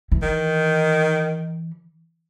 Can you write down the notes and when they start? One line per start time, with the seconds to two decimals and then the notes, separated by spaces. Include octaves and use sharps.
0.12 E3
0.22 D#3